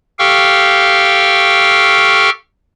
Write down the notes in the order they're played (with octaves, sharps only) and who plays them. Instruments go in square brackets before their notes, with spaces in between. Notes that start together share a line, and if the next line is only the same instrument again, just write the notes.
[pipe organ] G4 A4 F5 G5 C#6 F6